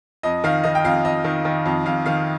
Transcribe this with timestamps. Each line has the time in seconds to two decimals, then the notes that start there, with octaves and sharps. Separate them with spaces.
0.23 F2 D#5
0.44 D#3 F5
0.64 D#3 D#5
0.75 G5
0.84 F2 F5
1.05 F2 D#5
1.24 D#3
1.45 D#3
1.65 F2
1.86 F2 F5
2.06 D#3 F5